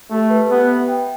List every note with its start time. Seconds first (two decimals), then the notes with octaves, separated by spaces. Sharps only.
0.10 A3 G4
0.30 B4
0.49 B3 G4
0.68 E5
0.88 G5